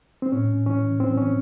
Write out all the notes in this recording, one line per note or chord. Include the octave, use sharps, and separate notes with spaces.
C4
A2 C#4
E3 C#4
E3 C4
C#4